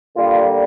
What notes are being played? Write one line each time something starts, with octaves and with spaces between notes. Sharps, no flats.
D3 G3 A#3 F4